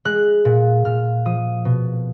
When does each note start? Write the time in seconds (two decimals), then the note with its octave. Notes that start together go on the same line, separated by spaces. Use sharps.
0.05 G#3 F#6
0.45 A#2
0.85 A#2 F6
1.25 F3 D#6
1.65 B2